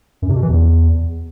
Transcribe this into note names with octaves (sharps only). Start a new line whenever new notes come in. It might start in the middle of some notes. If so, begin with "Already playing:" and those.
F#2
C3
B2
E3
E2